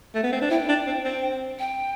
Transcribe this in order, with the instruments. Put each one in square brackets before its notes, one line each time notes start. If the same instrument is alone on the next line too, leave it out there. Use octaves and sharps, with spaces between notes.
[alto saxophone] A3
B3
C4
D4
[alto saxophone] E4 [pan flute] G5
[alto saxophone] D4
C4
C4
[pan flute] G5